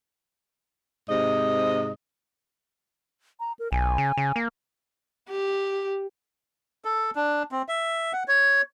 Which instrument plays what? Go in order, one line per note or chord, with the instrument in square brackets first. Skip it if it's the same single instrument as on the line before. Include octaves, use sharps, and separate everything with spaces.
[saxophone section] G#2 C3 D#5
[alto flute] A#5
A#4
[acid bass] B1 [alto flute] G#5
[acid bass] C#3
C#3
A#3
[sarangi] G4
[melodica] A4
D4
C4
E5
F#5
C#5